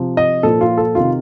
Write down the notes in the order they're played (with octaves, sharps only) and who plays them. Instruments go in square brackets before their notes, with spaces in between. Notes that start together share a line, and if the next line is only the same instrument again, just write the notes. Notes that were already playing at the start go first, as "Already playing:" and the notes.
Already playing: [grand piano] C3 F3
D#5
A#2 F3 A4
F4
A4
C3 D#3 F4